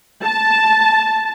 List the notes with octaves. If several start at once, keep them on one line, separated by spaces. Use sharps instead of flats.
A5